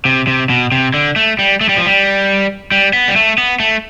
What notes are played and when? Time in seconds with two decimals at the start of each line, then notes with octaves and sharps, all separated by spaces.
0.05 C3
0.27 C3
0.50 B2
0.72 C3
0.94 D3
1.16 A3
1.39 G3
1.61 A3
1.69 G3
1.77 F3
1.86 G3
2.72 G3
2.93 B3
3.08 G3
3.16 A3
3.38 B3
3.60 A3